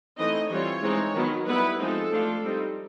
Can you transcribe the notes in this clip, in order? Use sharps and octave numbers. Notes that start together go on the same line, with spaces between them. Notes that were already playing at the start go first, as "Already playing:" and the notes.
E3 A3 C4 D#4 D#5
E3 G3 C4 F4 C#5
E3 G#3 C4 D#4
D#3 F#3 B3
G3 B3 E4 B4
F3 G#3 C4 D#4 A4
F3 A3 D4 F4
G3 C4 D#4